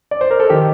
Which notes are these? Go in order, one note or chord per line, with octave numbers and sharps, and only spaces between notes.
D5
C5
A#4
A4
D#3 G4